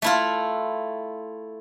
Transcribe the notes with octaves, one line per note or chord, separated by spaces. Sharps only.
A3 E4 F4